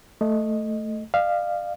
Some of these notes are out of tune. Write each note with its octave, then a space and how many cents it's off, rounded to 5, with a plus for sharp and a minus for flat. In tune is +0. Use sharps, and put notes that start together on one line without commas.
A3 +0 D#5 -5
D5 +40 F5 -5